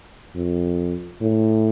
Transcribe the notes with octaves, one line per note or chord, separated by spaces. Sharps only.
F2
A2